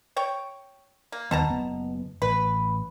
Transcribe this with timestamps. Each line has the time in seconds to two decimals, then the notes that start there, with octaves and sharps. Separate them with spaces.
0.16 C#5 G5
1.12 A#3
1.31 D#2 B2 D#3 B3 A5 A#5
1.48 F#1 B3
2.22 A1 B4